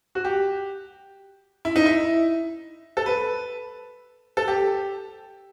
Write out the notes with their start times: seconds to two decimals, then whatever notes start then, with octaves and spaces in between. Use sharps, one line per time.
0.15 F#4
0.25 G4
1.65 E4
1.76 D#4
1.86 E4
2.97 A4
3.06 B4
4.37 A4
4.48 G4